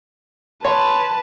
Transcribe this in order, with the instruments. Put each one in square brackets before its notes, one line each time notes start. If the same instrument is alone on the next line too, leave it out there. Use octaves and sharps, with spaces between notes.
[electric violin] B4 A5 [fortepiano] C#5 [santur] C6